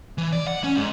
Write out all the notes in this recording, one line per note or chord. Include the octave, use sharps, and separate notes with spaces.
E3
D5
F#5
C#4
G#2